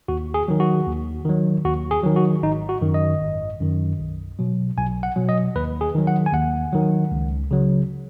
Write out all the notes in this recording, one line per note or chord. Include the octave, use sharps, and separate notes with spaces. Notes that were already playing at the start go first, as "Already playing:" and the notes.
D#2 F#4
G#4
D#3 F#3
F#4
D#2
D#3 F#3
D#2 F#4
G#4
D#3 F#3
F#4
G#1 D#4
F#4
F#2 D#3
D#5
G#1
F#2 D#3
B1
B2 F#3
B1 G#5
F#5
B2 F#3
D#5
D#2 B4
G#4
D#3 F#3
F#5
G#5
D#2 F#5
D#3 F#3
C#2
C#3 F#3